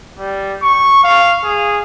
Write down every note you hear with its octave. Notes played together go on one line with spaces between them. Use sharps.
G3
C#6
F5
G#4